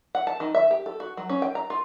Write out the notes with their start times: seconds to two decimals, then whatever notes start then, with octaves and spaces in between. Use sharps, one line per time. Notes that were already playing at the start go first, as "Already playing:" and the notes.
0.15 F#5
0.27 A5
0.40 D#3
0.55 E5
0.71 G4
0.86 A4
1.00 F#4
1.17 F#3
1.29 C#4
1.42 G5
1.55 A#5
1.70 F4